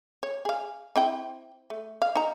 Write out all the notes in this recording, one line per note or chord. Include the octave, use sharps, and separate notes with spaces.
C#5
G#4 F5
C4 E4 G5
A3
F5
D#4 A#5